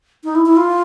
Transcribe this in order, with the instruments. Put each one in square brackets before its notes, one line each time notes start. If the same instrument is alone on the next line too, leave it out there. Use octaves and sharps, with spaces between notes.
[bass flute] D#4
E4
E4
F4